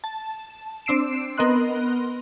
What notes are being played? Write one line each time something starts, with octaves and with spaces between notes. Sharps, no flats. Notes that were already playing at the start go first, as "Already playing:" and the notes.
A5
C4 D4 E6 C7 D7 E7
B3 A#4 D#5 C6 F#6